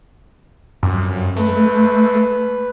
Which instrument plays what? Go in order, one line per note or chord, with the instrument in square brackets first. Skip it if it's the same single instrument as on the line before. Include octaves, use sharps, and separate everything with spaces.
[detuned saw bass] F#2
[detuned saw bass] A3 [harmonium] B4